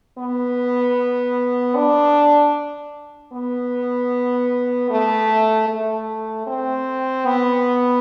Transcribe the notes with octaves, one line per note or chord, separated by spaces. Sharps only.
B3
D4
B3
A3
A3
C4
B3